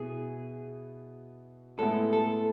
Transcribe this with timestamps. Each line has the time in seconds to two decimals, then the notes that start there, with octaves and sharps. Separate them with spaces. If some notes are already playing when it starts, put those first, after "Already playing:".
Already playing: B2 B3 E4 G#4
1.79 A2 G#3 B3 E4 A4
2.13 A4